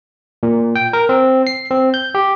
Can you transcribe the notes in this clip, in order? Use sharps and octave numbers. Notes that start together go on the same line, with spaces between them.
A#2
G5
A#4
C4
C7
C4
G6
G4